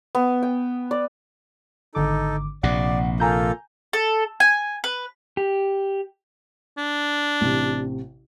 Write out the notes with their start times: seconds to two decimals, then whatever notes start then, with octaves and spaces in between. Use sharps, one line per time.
0.15 B3
0.43 G5
0.91 D5
1.95 G#1 D3 D#4 A4 D6
2.63 A#1 C3 D5 F#5
3.20 A#3 F4 A4 G#5 A#5 G6
3.93 A4
4.40 G#5
4.84 B4
5.37 G4
6.78 D4
7.41 A1 C3